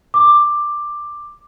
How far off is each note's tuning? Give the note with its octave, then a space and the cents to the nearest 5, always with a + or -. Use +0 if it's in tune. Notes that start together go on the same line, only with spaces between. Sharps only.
D6 +10